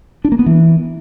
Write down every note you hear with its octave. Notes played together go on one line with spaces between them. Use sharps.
D4
A#3
B3
E3